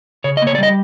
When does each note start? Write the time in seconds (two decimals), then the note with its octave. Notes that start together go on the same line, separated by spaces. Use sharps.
0.24 C#3 C#5
0.37 D#5
0.42 A#3 C#5
0.55 D5
0.58 G3 D#5